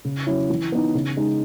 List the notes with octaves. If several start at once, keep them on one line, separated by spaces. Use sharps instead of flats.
C#3
F#3 C#4 E4
E3
B3 D#4
C#3
G#3 D#4